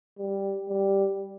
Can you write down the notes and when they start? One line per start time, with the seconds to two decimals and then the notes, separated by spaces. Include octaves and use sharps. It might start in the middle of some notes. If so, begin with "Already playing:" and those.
0.19 G3
0.68 G3